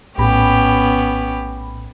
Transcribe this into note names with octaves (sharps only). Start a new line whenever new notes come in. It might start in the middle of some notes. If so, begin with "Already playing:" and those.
A#1 A2 B3 C#4 G4 B5